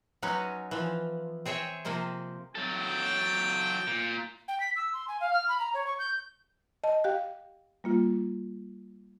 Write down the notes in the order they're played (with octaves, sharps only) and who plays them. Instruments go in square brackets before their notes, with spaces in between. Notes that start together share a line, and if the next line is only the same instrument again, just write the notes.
[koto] F#3 G#3 B3 C#4 D#4
E3 F3
C4 G#4 C#5 E5 G5
C3 F3 A#3 C5 D#5
[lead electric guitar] F#3 A4 [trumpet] G5
[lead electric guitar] A#2
[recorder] G5
B6
E6
C6
G#5
F5
F6
B5
A#5
C#5
C#6
G6
[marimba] D#5 A5
G4 F5 G5 F#6
G3 A#3 F4